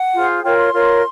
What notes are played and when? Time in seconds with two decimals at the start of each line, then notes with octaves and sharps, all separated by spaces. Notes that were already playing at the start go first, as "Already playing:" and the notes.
Already playing: F#5
0.14 F4 G#4 C5
0.44 F4 A#4 C#5 G5
0.58 C6
0.73 F4 A#4 C#5